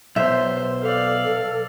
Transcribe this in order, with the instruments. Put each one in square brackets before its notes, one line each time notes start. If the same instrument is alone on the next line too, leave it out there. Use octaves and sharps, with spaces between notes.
[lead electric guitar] B1 [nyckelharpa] C5 [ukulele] E5
[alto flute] A4 [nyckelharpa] D5 F5